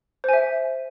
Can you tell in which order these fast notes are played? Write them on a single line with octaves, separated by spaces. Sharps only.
C5 G#5 E5